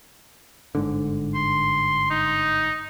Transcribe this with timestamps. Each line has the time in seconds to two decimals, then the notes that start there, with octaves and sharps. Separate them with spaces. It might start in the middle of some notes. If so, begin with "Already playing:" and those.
0.75 G1 G#2 D3
1.35 C6
2.10 D#4